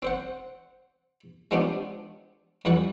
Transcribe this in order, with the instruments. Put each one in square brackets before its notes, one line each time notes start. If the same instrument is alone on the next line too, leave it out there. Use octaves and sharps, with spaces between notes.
[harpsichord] C4 C5 F#5
G#3 B3 C4 D4 F4 G4
F2 E3 G3 B4 F#5